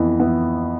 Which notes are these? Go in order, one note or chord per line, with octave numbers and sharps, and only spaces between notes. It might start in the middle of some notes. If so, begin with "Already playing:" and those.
Already playing: F2 E3 B3 E4
E3 B3 E4